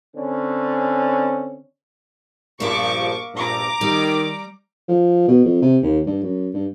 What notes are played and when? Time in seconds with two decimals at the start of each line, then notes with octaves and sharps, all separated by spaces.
0.15 D3 C4 C#4
2.60 A#1 G2 F3 A#3 E5 C#6 D6
3.34 A#1 G2 A#5 D6
3.81 D#3 G3
4.89 F3
5.28 B2
5.45 F2
5.62 C3
5.83 D#2
6.07 G2
6.23 F#2
6.54 G2